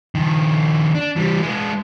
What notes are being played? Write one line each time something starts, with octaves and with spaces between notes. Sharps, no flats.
D#3 F3
D4
E3 G3
G#3 B3